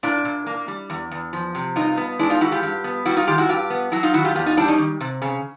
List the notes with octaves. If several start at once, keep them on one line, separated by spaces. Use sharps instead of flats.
A#2 D4 E4
A#2
A#3
G3
E2
E2
F3
C3
G2 D#4 F4
B3
G#3 D4 E4
D#4 F4
E3 E4 F#4
F4 G4
G2
B3
G3 E4 F#4
D#4 F4
D#3 F4 G4
E4 F#4
G2 F4 G4
B3
F#3 E4 F#4
D#4 F4
D#3 E4 F#4
F4 G4
E2 F4 G4
D#4 F4
G3 D4 E4
C#4 D#4
D#3
C3
C#3